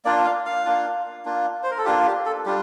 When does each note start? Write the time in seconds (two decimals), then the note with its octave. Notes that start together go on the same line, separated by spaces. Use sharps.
0.05 A#3 D4 F4 D5
0.25 F5
0.46 F5
0.65 A#3 D4 F4
1.25 A#3 D4 F4
1.63 C5
1.71 A#4
1.78 A4
1.85 A#3 D4 F4 G4
2.06 G4
2.26 A4
2.46 G3 D4 F4 G4